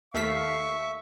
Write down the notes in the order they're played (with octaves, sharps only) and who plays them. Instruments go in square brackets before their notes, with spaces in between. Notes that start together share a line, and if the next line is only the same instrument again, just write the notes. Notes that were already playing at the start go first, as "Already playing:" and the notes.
[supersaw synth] D#2 A3 B6 [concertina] E5 [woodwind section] F5 [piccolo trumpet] C#6